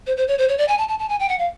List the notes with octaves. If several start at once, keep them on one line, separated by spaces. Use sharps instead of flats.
C5
C5
C#5
C5
C#5
D5
G#5
A5
A5
A5
G#5
G5
F#5
F5